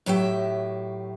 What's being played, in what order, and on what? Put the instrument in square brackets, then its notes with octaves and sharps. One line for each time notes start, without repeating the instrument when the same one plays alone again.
[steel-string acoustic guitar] A2 F#3 G4 E5